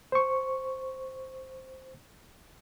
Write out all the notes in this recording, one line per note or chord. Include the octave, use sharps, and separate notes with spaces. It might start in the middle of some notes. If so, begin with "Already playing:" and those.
C5 C#6